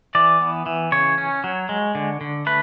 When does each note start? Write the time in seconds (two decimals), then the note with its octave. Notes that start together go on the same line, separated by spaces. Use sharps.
0.15 E3 D5
0.41 B3
0.66 E3
0.92 C#3 C#5
1.18 C#4
1.44 F#3
1.69 G#3
1.95 D3
2.21 D3
2.46 A3 B4